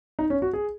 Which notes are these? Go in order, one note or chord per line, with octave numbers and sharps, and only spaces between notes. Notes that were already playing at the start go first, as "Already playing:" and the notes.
D#4
C#4
F#4
G#4